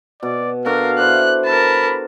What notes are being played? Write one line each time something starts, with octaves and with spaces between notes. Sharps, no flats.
B2 D5
D4 F#4 A4 A#4 F5
E4 C5 D5 F#6
A#4 A5 B5